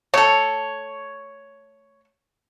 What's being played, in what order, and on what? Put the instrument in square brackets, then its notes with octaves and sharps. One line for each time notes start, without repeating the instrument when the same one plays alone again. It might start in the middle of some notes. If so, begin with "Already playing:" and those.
[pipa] A3 A4 [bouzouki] C#5